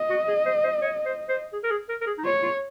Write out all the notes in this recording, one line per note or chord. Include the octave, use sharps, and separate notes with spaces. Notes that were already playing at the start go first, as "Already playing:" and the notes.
Already playing: D#5
F#4
G#4
C5
C5
C#5
C5
C5
G#4
A#4
G#4
A#4
A#4
G#4
D#4
F4 C#5
F4